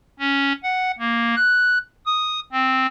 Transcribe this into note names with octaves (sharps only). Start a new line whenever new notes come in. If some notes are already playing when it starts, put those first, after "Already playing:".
C#4
F#5
A#3
F#6
D#6
C4